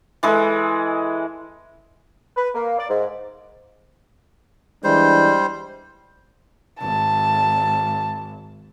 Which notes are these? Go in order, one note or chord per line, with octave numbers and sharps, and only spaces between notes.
E3 G#3 A4
B4
A#3
D5
G#2
E3 G3 G#3 D4 C5
G#1 A5